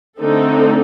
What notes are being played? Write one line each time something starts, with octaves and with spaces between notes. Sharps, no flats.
D3 A3 C4 D#4 A4